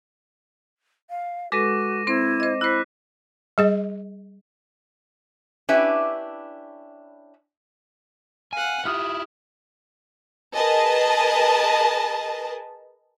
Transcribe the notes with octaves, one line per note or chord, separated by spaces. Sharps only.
F5
G#3 F#4 A4 B4 D6 A#6 D#7
C4 E4 C5
C5 D#5
E4 C5 B5 F#6 B6
G3 G#4 D#5
C#4 D4 E4 G4 B4 E5
F5 F#5 G#5
E4 F4 G4 D#6 F6
G#4 A#4 B4 D#5 A5